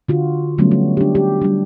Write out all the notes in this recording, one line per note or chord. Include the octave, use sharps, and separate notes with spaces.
D3 F4 F#4
D3 F#3 G3 A3 B3 C#4
F#4
D4 G4
G4
G3 D4